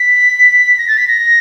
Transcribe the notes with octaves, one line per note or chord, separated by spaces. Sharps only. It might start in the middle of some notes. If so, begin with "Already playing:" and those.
Already playing: B6
A#6
A6
B6
A#6